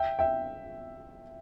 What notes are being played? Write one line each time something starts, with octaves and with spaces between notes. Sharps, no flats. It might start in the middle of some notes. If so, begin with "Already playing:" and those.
Already playing: E5 G5
E5 G5